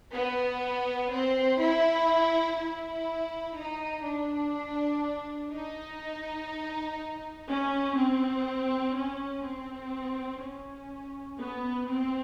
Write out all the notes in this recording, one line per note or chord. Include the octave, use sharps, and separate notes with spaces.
B3
C4
E4
E4
D#4
D4
D#4
C#4
C4
C#4
C4
C#4
B3
C4